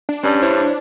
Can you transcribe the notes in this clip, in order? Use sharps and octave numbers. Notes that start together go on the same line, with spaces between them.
D4
G2 C#4 D5
E4 C5 C#5